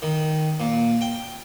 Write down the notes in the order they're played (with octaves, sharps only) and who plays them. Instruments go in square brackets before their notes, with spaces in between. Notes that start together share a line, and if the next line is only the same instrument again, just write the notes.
[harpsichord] D#3
A#2
G5